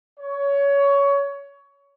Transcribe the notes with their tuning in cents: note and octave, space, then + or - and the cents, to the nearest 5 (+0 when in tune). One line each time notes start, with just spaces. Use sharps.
C#5 +20